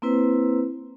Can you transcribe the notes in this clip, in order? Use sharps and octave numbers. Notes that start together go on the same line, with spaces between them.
A#3 C4 E4 B4 C5